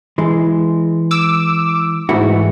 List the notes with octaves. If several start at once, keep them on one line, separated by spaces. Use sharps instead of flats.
E3 G#3
D6 E6
G#2 E3 A3 F#4